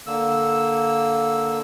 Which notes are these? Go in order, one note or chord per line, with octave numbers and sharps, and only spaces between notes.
D3 A#3 E6